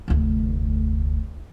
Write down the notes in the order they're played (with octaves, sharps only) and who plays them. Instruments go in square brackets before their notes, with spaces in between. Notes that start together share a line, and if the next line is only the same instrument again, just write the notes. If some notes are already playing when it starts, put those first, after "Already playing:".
[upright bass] F1 D2